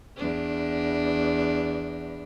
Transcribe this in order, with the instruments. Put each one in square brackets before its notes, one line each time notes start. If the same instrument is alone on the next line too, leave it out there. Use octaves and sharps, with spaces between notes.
[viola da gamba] E2 D4